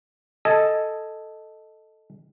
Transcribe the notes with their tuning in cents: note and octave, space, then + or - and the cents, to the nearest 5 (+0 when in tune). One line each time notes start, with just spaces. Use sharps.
A4 +0 D#5 +0 G#5 +0